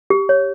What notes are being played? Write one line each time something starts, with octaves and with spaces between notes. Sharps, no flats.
G4
C#5